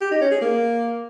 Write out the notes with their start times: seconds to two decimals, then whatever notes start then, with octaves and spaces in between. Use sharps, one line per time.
0.01 G4
0.11 D#4
0.21 C#4
0.31 G#4
0.41 A#3